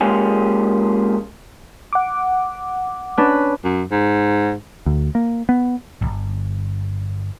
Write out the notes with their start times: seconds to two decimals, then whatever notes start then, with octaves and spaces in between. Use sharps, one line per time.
0.01 G#3 A#3 C#4 F4 G4 G#4
1.93 F#5 D6
3.18 C#4 D4 B4
3.64 F#2
3.91 G#2
4.86 D2
5.15 A#3
5.49 B3
6.01 D1 G1